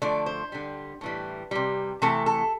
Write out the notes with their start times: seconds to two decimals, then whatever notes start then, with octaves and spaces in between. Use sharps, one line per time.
0.02 D3 F3 A3 D5
0.26 C5
0.52 D3 G3
1.01 A2 E3 G3
1.51 C3 G3
2.02 C3 E3 A3 A4
2.26 A4